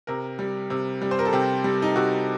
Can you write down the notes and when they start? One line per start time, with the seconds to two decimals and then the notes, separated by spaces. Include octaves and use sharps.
0.07 C3 A#4
0.39 G3
0.70 C3
1.01 G3
1.11 C5
1.19 A#4
1.25 A4
1.33 C3 G4
1.64 G3
1.82 D#4
1.96 C3 F#4